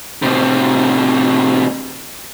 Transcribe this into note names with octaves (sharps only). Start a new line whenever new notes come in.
A2 C3